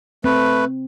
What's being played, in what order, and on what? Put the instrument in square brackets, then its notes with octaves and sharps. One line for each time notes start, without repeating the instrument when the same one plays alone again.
[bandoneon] A3 B4 [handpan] C4